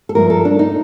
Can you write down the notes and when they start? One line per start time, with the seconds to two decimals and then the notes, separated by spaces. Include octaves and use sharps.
0.09 A4
0.15 G2 F3 A3 A#4
0.30 A4
0.45 D4
0.59 D#4